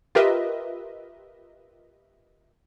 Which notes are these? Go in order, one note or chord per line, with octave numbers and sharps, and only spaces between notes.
F4 G4 A#4 B4 D#5 E5